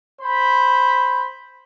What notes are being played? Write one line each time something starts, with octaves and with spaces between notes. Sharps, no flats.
C5 B5